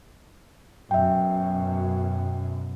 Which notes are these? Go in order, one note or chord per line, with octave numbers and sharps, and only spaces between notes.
F#2 B2 E5 G5